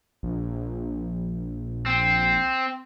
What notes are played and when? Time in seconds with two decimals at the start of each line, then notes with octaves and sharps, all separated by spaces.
0.23 A#1
1.86 C4